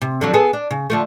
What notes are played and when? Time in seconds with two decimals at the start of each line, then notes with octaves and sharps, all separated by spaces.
0.02 C3
0.21 D3 F3 F#3
0.34 B3 G#4 A4
0.53 D4
0.71 C#3
0.90 D3 F3 A3